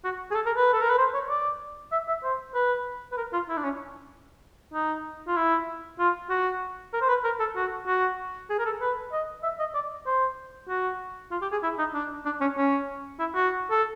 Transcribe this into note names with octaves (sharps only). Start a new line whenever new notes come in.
F#4
G#4
A4
A#4
B4
A4
A#4
B4
C5
C#5
D5
E5
E5
C5
B4
B4
A#4
F4
E4
D4
C#4
D#4
F4
E4
F4
F#4
A#4
C5
B4
A#4
A4
F#4
F#4
G#4
A#4
A4
B4
D#5
E5
D#5
D5
C5
F#4
F4
G4
G#4
E4
D#4
D4
D4
C#4
C#4
E4
F#4
A4